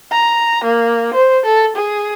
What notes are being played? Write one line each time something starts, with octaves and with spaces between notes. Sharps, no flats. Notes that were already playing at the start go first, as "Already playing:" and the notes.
A#5
A#3
C5
A4
G#4